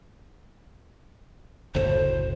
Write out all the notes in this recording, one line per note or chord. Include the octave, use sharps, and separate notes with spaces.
F#1 D2 A2 C5